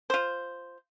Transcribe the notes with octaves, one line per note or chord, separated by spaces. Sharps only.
F4 C5